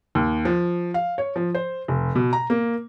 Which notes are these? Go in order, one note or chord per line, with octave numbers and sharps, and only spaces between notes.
D#2
F3
F5
C#5
F3
C5
F1
B2
A#5
A#3